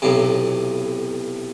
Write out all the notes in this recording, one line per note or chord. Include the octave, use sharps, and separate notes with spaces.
B1 A2 C3